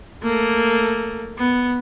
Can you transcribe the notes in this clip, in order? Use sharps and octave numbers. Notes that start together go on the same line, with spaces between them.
A3 A#3
B3